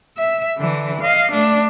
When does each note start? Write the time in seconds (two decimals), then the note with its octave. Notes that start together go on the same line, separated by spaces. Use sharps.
0.18 E5
0.58 D3 E3
1.02 D#5 F5
1.32 A3 D4